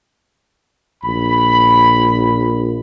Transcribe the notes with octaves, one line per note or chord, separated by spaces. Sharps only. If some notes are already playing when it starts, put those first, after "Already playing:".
A#1 B5